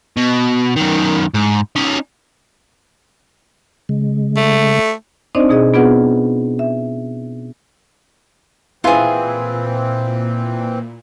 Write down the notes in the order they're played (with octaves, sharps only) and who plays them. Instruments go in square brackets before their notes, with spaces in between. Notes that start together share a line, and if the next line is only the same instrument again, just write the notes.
[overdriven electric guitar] B2
F#2 D#3
G#2
C#4 D#4
[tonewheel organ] C#3 G#3
[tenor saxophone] A3
[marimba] C4 D4 D#4 C5 D5 D#5
B2 G#4 D#5
B3 D4 F4 G#4 B4 F#5
E5
[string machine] A#2 [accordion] E3 C4 [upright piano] E4 B4 C6 [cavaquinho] F4 G#4